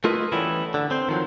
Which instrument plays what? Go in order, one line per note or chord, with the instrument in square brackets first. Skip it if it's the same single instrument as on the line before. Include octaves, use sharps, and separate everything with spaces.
[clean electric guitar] A3 E4 F4 A#4 B4 D#5
E3 G3 A3 B3 C#4 E4
D3
C4 C5
D#3 F3 F#3